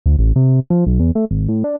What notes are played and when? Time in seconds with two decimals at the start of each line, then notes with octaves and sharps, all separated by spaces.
0.06 D2
0.19 A1
0.36 C3
0.70 F3
0.87 B1
1.00 E2
1.15 A3
1.31 G#1
1.49 A2
1.64 D4